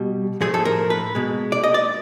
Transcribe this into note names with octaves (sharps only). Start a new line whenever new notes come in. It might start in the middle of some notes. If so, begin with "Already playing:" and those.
Already playing: B2 G3
A2 F3 A3 G#4
A4
A#4
B4
B2 G#3
D5
D#5
D5